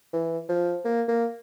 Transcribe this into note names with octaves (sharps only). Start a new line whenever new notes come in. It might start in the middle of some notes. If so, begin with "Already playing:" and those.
E3
F3
A#3
A#3